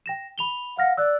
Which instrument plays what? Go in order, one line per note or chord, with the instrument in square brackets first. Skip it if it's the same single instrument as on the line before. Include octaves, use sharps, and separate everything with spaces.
[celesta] G5 A#6 E7
B5 F7 G7
[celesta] F5 F6 A#6 [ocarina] F#5
[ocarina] D5 [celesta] E6 F#6